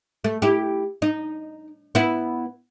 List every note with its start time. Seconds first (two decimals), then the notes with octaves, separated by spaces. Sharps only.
0.24 A3
0.42 E4 G4
1.02 D#4
1.95 B3 E4